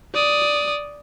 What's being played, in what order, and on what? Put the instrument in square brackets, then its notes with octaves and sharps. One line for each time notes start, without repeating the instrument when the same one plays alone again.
[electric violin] D5 D#6